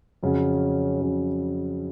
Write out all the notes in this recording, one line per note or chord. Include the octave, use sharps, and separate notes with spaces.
F2 C#3 F#3 C#4
C#3 F#3 C#4